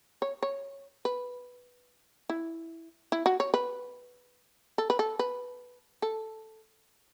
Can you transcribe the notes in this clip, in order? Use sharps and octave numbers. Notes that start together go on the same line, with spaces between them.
C#5
C#5
B4
E4
E4
F#4
C#5
B4
A4
B4
A4
B4
A4